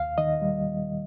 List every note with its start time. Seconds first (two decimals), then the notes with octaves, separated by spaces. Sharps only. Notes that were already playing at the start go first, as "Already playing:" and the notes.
Already playing: D#2 F5
0.18 D#3 D#5
0.42 G3